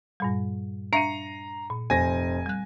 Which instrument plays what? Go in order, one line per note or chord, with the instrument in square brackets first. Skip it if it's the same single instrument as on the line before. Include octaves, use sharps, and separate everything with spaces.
[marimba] G2 A#2 G3
[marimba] D4 E5 F5 [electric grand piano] A#5 [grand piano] C7 C#7 D#7
[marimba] A#2
[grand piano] F1 C5 A#6 [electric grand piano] G#5
[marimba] G3 F#6